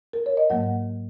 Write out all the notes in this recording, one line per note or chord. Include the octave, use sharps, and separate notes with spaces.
A#4
C#5
D#5
G#2 F#3 A#3 F#5